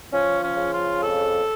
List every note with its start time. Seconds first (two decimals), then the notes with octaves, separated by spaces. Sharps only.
0.13 F3 C#4
0.43 C#4
0.57 C#3
0.72 F4
1.01 F2 A4